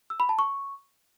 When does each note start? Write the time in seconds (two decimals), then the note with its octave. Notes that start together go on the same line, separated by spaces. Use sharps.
0.10 E6
0.20 B5
0.29 A5
0.39 C#6